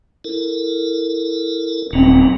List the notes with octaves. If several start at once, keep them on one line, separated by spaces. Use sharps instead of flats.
E4 A4 A#4
D#1 F#3 A#3 C4